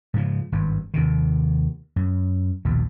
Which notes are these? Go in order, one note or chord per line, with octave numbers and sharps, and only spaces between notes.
G#2 C#3 F3
G#1 G2
D#2 C3 D#3
F#2
A#1 D#2 B2